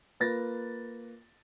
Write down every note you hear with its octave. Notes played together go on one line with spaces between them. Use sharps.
A#3 F4 B4 A6 A#6